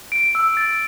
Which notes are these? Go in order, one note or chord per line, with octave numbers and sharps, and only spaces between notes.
D7
E6
A6